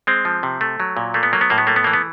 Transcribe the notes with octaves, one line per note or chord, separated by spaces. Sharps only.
G#3 C4
F3
C3
A3
F#3
A#2
A3 A#3
B3
F#3 A#3
B3
A2 A#3
B3
A3 A#3
B3
E3 A#3
B3